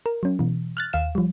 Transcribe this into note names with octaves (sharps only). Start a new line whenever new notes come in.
A#4
F#3 C#4
B2 E3
F6 F#6 A6
D#2 F5 E7
F3 G3